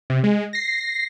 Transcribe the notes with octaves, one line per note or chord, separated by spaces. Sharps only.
C3
G#3
A#6 C7